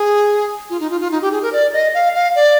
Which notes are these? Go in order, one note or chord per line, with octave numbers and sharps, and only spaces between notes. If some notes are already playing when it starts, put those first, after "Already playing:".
Already playing: G#4
F4
D#4
F4
F4
D#4
G4
G#4
A#4
D5
D#5
F5
F5
D5